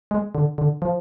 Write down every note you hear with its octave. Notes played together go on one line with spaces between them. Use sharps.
G#3
D3
D3
F3